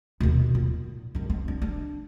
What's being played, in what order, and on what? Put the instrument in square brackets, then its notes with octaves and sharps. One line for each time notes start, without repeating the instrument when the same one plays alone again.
[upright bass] D#2 B2
A#2
G2 D#3
C4
D4
D4